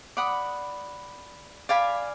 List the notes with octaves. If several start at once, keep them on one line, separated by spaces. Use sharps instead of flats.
D5 F#5 B5 D#6
D5 F5 G#5 B5